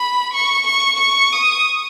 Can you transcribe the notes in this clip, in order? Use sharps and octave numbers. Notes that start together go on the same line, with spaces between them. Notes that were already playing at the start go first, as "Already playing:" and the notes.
Already playing: B5
C#6
C#6
C#6
D#6